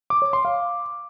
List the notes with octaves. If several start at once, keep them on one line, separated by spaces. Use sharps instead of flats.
D6
C#5
C6
F5